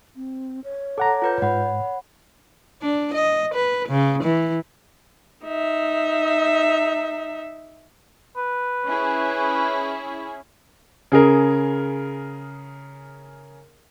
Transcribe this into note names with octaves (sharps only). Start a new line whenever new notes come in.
C4
C#5
A4 F#5 A#5 D6
F4 B4 G6
G#2 F#5 B5
D4
D#5
B4
C#3
E3
D#4 E5
B4
C#4 E4 G#4
C#3 G#4 A#4